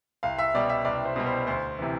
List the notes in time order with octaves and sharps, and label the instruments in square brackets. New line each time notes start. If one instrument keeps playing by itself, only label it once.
[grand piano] C2 F5
E5
B2 G3 D5
E5
C2 D5
C5
B2 G3
C5
D2 C5
C3 E3